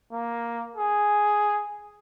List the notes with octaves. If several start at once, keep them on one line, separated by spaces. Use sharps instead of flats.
A#3
G#4